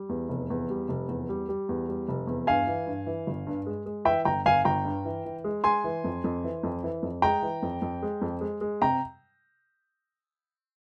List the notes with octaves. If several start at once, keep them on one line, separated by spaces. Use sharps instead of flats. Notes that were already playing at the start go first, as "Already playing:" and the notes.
Already playing: G3
E2
F1
E2
G3
F1
E2
G3
G3
E2
G3
F1
E2
G2 F5 G#5
E3
G2
E3
G1
G2
G#3
G#3
E3 E5 G5
G1 G5 A#5
G1 F5 G#5
G1 G5 A#5
G2
E3
E3
G#3
G#3 G#5 C6
E3
F2
F2
E3
F2
E3
F2
G#3 G5 A#5
E3
F2
F2
G#3
F2
G#3
G#3
C3 G5 A#5